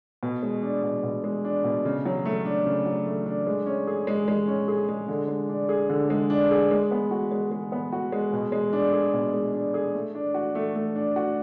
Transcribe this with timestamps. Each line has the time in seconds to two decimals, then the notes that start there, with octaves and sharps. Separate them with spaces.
0.23 B2
0.43 G#3
0.63 D4
0.84 B2
1.04 B2
1.24 G#3
1.44 D4
1.64 B2
1.85 C#3
2.05 F#3
2.25 A3
2.45 D4
2.66 C#3
2.86 F#3
3.07 A3
3.26 D4
3.47 G#3
3.66 C#4
3.87 G#4
4.07 G#3
4.28 G#3
4.48 C#4
4.68 G#4
4.89 G#3
5.08 D3
5.28 G#3
5.49 D4
5.69 G#4
5.90 D3
6.10 G#3
6.30 D4
6.51 G#4
6.71 G#3
6.91 B3
7.11 F#4
7.32 G#3
7.51 G#3
7.72 B3
7.93 F#4
8.12 G#3
8.33 B2
8.52 G#3
8.73 D4
8.93 G#4
9.14 B2
9.34 G#3
9.53 D4
9.74 G#4
9.95 A3
10.15 D4
10.34 F#4
10.55 A3
10.75 A3
10.96 D4
11.16 F#4